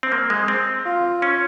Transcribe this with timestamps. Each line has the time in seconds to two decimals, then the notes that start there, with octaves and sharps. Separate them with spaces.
0.03 C4
0.12 A#3
0.30 G#3
0.48 C4
0.86 F4
1.22 C#4